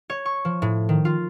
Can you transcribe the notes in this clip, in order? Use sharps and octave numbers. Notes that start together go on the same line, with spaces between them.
C#5
C#6
F3
A2
D#3
F4